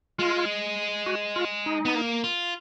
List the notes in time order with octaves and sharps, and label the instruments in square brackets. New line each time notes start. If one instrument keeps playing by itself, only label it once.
[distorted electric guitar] G#3 [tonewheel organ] F4
[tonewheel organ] F#4
F4
D#4
[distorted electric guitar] B3
A#3
F4